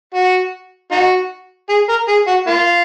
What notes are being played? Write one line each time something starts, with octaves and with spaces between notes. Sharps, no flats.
F#4
D#4 F#4
G#4
A#4
G#4
F#4
A#3 F4